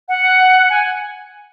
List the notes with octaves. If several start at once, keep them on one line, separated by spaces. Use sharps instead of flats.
F#5
G#5